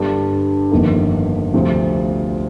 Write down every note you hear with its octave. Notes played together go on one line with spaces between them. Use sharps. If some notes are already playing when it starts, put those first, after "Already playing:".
Already playing: G2 D3 G3 D4
G1 F2 D#3 A#3
D2 C3 F3 C4 F4